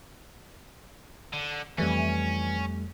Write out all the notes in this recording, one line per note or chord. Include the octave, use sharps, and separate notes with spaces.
D3
F2 E3 G3 A3 C#4